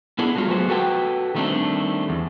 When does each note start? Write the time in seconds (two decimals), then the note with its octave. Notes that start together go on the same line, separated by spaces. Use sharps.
0.19 B3 D4 E4 G#4 A4
0.36 F#3 G#3 A3 F4
0.48 F#3 A3 B3 G#4 C5
0.69 F#4 A4 B4 G5
1.35 D#3 G3 A3 A#3 C4 D4
2.09 E2